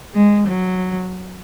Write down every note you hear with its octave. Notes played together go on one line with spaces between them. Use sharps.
G#3
F#3